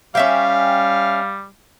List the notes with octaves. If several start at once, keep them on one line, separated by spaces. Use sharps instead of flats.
G3 C#4 E5 F5 G5